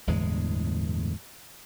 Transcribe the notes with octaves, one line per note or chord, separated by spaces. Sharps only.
G1 E2 A2 G#3